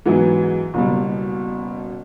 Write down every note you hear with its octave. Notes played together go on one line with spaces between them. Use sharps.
G#2 E3 F#3 B3
F#1 B2 G3